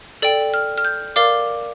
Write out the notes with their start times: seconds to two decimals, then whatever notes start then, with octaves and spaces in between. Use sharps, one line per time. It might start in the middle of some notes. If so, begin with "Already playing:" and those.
0.22 A4 D5 G5
0.54 F6
0.78 F6
0.85 G6
1.16 A#4 D5 F5 D6